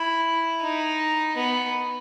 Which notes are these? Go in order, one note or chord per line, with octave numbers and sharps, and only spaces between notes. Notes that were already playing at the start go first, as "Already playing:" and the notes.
Already playing: E4
D#4
B3